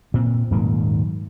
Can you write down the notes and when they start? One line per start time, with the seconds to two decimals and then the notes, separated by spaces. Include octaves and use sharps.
0.14 A#2 C4
0.51 D#1 G#2 F#3 A#3